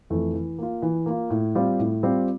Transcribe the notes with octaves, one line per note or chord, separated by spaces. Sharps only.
F2 E3 A3
E3
A#3 F4
E3
A#3 F4
A2
G3 C4 F4
A2
G3 C4 F4